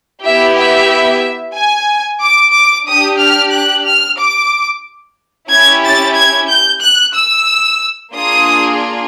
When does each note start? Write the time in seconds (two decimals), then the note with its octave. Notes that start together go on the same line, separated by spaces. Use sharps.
0.24 B3 E4 G4 E5
0.57 E5
1.56 G#5
2.21 D6
2.54 D6
2.87 D4 G4 D#6
3.21 F6
3.54 F#6
3.86 F6
4.19 D6
5.50 C#4 E4 G4 G#6
5.83 A6
6.17 G#6
6.50 G6
6.82 F#6
7.15 E6
8.13 A#3 D4 F4 G#4 D#6